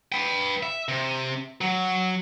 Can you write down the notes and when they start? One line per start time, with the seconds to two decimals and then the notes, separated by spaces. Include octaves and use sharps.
0.12 B4 G5
0.63 E5
0.88 C3
1.61 F#3